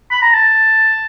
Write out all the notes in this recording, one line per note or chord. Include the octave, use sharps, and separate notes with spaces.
B5
A#5
A5